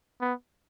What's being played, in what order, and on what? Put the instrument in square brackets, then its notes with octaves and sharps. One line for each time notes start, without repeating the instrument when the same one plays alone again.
[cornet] B3